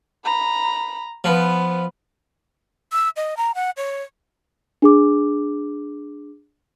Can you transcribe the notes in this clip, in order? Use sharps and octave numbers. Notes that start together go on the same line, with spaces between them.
A#5 B5
F3 B3 B4
E6
D#5
A#5
F#5
C#5
D4 G#4 D6